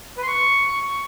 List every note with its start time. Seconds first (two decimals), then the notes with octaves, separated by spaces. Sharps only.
0.17 B4
0.22 C6
0.28 C#6